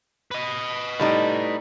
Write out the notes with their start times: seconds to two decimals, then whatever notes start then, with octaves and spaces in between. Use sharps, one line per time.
0.31 B4 D#5
0.99 A2 G3 D#4